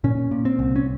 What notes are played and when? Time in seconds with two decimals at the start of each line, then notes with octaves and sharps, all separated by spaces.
0.04 A#2 C#4
0.31 A#2
0.45 C4
0.59 C2
0.76 C#4